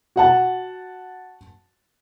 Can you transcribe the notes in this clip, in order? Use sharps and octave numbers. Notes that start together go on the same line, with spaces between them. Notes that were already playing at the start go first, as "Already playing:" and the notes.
F#4 F#5 A5